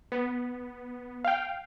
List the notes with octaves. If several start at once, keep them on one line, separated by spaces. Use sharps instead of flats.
B3
F5 G5